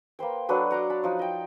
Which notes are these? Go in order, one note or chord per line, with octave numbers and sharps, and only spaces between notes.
A#3 B4 C5 G5
F#3 D4 A4 B4
F#5 A#5 C6 D6
A5 B5
F3 D#4
D#5 G5